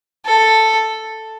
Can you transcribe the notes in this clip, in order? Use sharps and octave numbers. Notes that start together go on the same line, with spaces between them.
A4